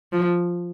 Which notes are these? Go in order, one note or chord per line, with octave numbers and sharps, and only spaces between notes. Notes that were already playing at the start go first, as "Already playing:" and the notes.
F3